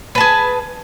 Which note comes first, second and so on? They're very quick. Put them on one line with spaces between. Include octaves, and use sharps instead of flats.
B4 A5 G#4